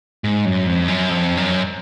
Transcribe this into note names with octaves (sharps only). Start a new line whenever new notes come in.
G#2
F#2
F2
F#2
F2
F#2